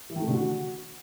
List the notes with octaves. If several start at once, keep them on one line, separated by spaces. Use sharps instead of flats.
E3
D#3
A3
D3
F#4